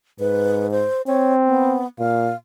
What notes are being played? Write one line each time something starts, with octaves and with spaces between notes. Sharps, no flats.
G#2 B4
C5
C4 C#5
B3
A#2 F5